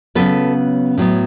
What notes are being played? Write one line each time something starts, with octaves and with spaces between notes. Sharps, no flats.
C#3 F#3 B3 A4 B4
A2 F#3 B3